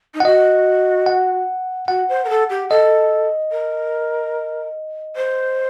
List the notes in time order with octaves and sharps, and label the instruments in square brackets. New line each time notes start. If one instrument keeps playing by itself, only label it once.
[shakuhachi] D#4
[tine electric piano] F#5
[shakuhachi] F#4 [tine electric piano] D#5
[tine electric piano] F#5
[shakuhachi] F#4 [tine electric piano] F#5
[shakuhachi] C5
A#4
A4
G4
[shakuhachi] A4 [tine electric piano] D#5
[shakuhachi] A#4
C5